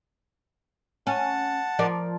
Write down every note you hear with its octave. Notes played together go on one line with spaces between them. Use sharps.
C#4 F#5 A5
F3 A#4 D5